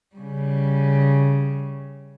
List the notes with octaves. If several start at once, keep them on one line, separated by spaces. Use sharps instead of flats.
C#3 G3